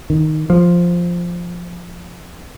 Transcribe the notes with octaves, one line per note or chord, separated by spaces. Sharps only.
D#3
F3